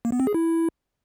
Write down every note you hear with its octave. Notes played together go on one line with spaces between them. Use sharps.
A#3
B3
C4
G#4
E4